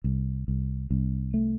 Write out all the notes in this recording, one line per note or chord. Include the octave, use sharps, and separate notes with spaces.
C2
C2
C2
A3